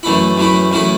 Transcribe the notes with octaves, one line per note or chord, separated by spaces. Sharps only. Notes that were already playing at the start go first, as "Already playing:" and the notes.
F#2 E3 A3 E4
F#2 E3 A3 E4
F#2 E3 A3 E4